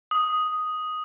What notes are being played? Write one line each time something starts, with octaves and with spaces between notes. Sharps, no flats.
D#6